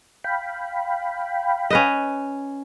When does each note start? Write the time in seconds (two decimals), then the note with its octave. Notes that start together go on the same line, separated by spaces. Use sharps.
0.24 F5 G5 B5
1.70 C#4 B4 D#5